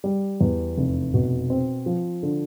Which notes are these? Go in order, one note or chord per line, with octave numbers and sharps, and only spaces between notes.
G3
E2
F1
B2
C4
F3
D3